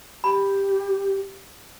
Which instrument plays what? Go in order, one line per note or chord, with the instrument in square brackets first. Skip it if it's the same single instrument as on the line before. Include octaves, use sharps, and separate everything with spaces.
[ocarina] G4 [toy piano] B5